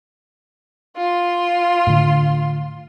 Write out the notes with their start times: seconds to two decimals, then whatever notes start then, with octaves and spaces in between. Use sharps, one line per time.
0.96 F4 C6
1.87 A2 D3